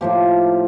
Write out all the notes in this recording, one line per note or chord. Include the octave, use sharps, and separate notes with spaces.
A2 F3 A#3 G4